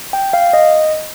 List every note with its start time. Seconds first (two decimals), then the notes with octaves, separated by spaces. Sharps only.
0.13 G5
0.33 F5
0.53 D#5